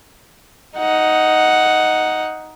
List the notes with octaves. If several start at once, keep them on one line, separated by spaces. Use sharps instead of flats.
D#4 F#5